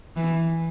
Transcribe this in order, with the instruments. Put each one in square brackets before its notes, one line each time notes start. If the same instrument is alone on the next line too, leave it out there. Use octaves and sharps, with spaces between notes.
[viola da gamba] E3